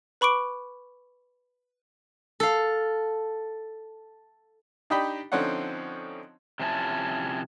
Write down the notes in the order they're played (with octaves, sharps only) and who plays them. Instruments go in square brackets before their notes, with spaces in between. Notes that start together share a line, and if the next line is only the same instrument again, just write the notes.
[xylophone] B4 B5 C#6 D6 D7
[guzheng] A4 F5
[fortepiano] D4 D#4 G4 D#5 G5 B5
D3 F3 C4 C#4 D#4 F#5
[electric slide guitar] C3 F3 C#4 D4 E4 A5